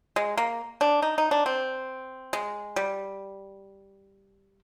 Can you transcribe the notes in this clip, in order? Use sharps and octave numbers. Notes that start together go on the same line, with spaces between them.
G#3
A#3
D4
D#4
D#4
D4
C4
G#3
G3